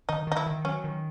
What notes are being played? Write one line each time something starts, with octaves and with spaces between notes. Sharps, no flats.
D#3 D#4
D#3 D#4
E4
D#3
F#3 C#4
D#3